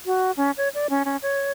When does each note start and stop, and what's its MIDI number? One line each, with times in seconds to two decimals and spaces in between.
0.06 0.31 66
0.37 0.51 61
0.57 0.69 73
0.74 0.87 74
0.90 1.03 61
1.05 1.17 61
1.22 1.52 73